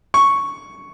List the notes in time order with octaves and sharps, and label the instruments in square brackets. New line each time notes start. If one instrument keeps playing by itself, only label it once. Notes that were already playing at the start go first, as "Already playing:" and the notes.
[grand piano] C#6